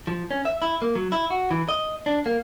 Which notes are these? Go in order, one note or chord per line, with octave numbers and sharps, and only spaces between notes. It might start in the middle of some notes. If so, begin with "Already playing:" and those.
F3
C#4
E5
E4
A#3
F#3
E4
F#4
E3
D#5
D4
A#3